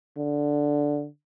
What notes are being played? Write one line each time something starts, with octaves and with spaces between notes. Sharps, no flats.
D3